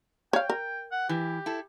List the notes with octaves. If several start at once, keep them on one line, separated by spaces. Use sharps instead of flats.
C#5 F5 G5
A#4
F#5
E3 G4
E4 A4